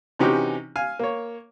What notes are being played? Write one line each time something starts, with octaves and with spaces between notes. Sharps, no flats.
C3 E3 C#4 D#4 F#4 G4
F5 G#5 F6
A#3 C#5